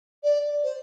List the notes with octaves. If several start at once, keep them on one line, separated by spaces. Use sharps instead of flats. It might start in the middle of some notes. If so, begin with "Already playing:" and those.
D5
C5